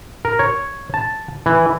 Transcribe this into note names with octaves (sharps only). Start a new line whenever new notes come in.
A#4
C#5
A5
E3